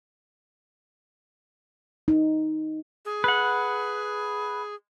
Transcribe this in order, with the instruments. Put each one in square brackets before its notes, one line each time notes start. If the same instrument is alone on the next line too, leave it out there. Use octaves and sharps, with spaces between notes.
[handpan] D#4
[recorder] G#4
[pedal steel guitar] B4 F#5